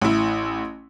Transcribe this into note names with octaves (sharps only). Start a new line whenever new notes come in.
A1 E4